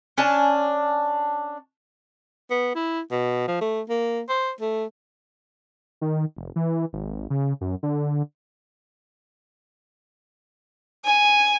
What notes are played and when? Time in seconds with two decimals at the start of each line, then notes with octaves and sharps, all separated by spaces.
0.18 C#4 D4 G#5 A5
2.51 B3
2.75 E4
3.11 B2
3.48 F3
3.61 A3
3.89 A#3
4.29 C5
4.61 A3
6.01 D#3
6.37 F1
6.56 E3
6.93 G#1
7.30 C#3
7.61 F#2
7.83 D3
11.04 G#5